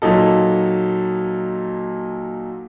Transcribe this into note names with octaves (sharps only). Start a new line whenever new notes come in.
A#2 F#3 D#4 A4